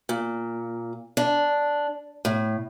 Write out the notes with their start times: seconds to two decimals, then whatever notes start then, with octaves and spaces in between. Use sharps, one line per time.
0.09 A#2
1.17 D4
2.25 A2